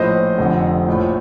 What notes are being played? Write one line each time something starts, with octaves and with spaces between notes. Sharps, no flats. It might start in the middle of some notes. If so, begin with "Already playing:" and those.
Already playing: A#1 A2 F3 C5 D#5
F1 F2 D3 F3
A#1 A2 F3